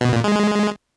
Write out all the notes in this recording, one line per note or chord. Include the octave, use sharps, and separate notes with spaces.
B2
A#2
G#3
G#3